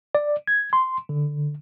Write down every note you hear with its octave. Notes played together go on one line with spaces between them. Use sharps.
D5
G#6
C6
D3